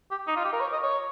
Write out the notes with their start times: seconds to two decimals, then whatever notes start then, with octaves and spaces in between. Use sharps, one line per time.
0.11 G4
0.27 D#4
0.36 F4
0.44 G4
0.53 A#4
0.61 C#5
0.72 D#5
0.83 C#5